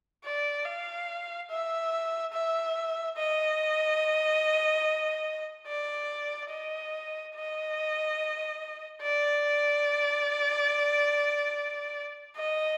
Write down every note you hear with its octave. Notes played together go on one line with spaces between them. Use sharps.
D5
F5
E5
E5
D#5
D5
D#5
D#5
D5
D#5